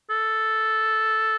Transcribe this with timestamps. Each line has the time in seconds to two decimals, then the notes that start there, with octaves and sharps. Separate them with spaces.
0.10 A4